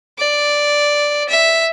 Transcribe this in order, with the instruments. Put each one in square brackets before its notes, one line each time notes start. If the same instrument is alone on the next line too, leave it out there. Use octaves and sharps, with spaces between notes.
[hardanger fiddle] D5
E5